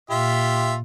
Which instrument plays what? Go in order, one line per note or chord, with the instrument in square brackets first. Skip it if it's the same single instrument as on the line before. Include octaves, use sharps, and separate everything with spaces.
[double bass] A#2 [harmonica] F4 G4 E5